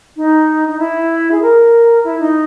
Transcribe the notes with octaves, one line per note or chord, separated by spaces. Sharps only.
D#4
D#4
E4
G#4
A#4
E4
D#4